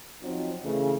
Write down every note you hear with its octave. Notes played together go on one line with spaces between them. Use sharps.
F3 F#3 C4 D#4
C#3 E3 A3